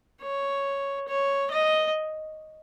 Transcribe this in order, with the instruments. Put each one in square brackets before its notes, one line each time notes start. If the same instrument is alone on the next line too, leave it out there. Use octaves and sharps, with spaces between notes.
[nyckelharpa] C#5
C#5
D#5